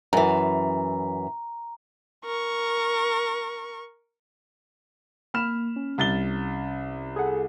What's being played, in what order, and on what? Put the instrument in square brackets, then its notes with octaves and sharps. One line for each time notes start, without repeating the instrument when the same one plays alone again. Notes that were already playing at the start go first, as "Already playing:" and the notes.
[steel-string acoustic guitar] F#2 E3 [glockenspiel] A#5
[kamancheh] A#4 C#6
[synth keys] A#3 [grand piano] B5 F6 E7
[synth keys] C#4
[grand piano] C2 A6 G7
[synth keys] G#4 A4 F#5